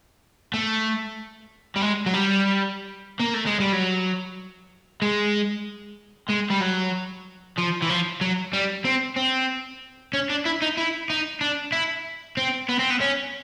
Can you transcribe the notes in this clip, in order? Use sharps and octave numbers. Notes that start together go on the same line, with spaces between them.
A3
G3
G#3
F#3
G3
A#3
A3
G#3
G3
F#3
G#3
G#3
G3
F#3
F3
E3
F3
F#3
G3
C4
C4
C#4
D4
E4
D#4
E4
D#4
D4
E4
C4
B3
C4
B3
C#4